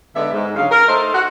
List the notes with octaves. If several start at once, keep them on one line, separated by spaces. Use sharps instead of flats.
D3 G#3 B3 D#4 D5 E5
G#2
D2 C#3 F#3 F5
A#4
A3 D#4 A4 C5
F#4